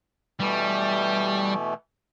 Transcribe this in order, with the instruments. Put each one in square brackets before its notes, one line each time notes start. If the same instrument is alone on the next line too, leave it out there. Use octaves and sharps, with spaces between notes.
[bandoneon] B2 E3 A3 [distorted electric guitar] G3